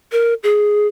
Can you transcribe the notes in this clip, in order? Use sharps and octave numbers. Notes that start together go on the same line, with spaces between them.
A#4
G#4